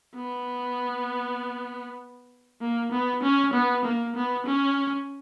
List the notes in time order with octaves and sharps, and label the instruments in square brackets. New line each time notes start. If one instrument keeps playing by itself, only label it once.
[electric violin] B3
A#3
B3
C#4
B3
A#3
B3
C#4